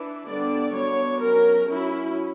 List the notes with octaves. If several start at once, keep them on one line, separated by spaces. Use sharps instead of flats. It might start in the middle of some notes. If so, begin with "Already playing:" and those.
Already playing: E3 D4
D3 G3 B3 D4 D5
F#3 B3 D4 C#5
F#3 C#4 A#4
F#3 C#4 E4